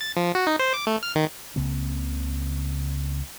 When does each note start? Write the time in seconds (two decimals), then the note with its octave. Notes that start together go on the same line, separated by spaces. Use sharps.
0.01 A6
0.17 F3
0.35 F#4
0.47 D#4
0.59 C5
0.74 D6
0.87 A3
1.03 F6
1.15 D#3
1.56 C#2 C#3 A#3 C4